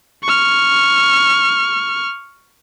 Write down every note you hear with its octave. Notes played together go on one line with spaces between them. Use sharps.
C#6 F6